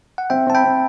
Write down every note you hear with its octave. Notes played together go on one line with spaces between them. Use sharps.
F#5
C4 E5 G5
C4 A5
G5 B5
C4